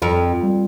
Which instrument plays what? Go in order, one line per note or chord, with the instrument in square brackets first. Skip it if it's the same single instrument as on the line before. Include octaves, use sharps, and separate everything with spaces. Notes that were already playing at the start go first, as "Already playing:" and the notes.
[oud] F2 [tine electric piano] F4
[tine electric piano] G3